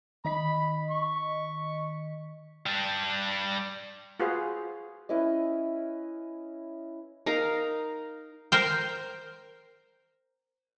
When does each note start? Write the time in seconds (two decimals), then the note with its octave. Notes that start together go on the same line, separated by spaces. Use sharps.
0.25 D#3 D#5 B5 B6
0.90 C#6
2.66 G3 D4
4.20 F4 F#4 G#4 B4 C5 F5
5.09 C#4 E4 B4 D#5
7.26 D#4 A#4 F5
8.52 A#4 C5 G5